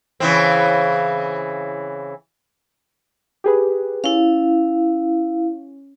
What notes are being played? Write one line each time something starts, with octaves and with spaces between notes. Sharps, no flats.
C#3 E3 C4
G4 G#4 B4
C#4 E4 F5